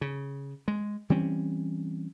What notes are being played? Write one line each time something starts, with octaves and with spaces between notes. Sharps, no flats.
C#3
G#3
E3 G3 C4 C#4